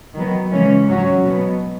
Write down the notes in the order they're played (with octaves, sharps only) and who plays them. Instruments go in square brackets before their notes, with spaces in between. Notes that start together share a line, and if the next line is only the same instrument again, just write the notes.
[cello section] D#3 F#3 B3
C#3 E3 G#3 C#4
G#2 F#3 C#4 F#4
B2 F#3 B3